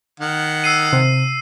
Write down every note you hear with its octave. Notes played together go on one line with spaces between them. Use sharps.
D#3 F#5
E6 C7 D#7
C3